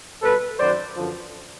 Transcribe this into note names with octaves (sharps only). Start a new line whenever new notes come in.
B2 G3 A4 B4
F#2 D#3 F#3 C5 D5
F#2 D3 F3